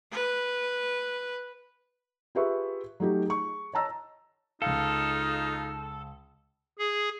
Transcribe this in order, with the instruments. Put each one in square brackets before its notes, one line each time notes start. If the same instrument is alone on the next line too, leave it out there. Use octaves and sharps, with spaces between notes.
[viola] B4
[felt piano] F4 G4 G#4 B4 E5 C#6
F#3 A3 D#4 G4
G#4 C#6
C#5 D#5 A5 A#5 E6
[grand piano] C#2 F5 [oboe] D#4 [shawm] F4 [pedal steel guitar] A4
[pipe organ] G#4